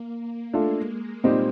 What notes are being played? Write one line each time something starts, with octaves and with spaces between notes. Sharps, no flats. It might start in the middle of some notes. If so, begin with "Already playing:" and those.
Already playing: A#3
G#3 A3 D4 F4 A4
A#2 G3 C4 D#4 G4